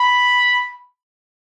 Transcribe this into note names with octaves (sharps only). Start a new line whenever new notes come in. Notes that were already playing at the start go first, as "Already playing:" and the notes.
Already playing: B5